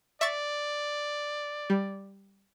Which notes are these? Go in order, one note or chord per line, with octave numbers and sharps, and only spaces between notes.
D5 E5 C#6 A6
G3